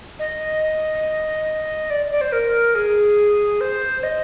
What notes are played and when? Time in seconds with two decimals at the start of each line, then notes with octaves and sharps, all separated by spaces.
0.19 D#5
1.90 D5
2.11 D5
2.21 C5
2.32 A#4
2.75 G#4
3.61 C5
4.03 D#5